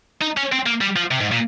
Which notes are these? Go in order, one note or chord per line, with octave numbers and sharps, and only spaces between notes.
D#4
C#4
C4
A#3
G3
F3
C3
G#2
A#2